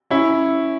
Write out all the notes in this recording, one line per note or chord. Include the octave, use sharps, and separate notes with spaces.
C#4 E4